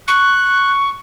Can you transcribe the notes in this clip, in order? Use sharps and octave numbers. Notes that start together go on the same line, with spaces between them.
C#6 F#6